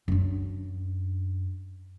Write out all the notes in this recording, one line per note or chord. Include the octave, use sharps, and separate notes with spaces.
F#2 D4